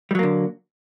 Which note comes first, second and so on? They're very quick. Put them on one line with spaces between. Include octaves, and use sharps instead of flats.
G3 F#3 A#3 D3